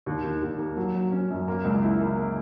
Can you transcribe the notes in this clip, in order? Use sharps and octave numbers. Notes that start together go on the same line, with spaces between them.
D#2
D#3
D#2
A#3
F#3
F#3
C#4
F#2
A#3
C#2
E4
A#3